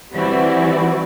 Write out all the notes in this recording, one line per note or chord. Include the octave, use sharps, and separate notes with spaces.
E3 G3 C4 E4 F#4 D5